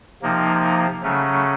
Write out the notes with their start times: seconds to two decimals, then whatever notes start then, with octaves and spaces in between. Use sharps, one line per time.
0.22 C3 F3 A#3 D#4
1.03 C#3 F#3 A3 C#4